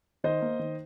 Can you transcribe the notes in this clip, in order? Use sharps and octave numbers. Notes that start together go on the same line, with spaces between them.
D#3 C5 D#5
A#3
D#3